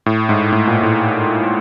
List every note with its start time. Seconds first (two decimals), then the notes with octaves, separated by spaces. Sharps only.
0.06 A2
0.29 G#2
0.52 A2
0.67 A#2
0.83 A2